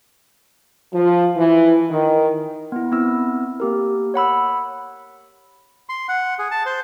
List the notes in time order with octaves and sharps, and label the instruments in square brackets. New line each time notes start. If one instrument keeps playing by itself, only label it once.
[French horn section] F3
E3
D#3
[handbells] B3 E4
B3 C4 E4 E6
A#3 G4 A#4
C#5 F#5 B5 E6
[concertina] C6
F#5
G#4
A5
C5